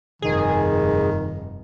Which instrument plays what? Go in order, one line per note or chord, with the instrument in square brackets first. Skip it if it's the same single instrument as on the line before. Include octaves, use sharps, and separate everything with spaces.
[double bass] F1 G2 [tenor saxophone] D#3 [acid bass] G#4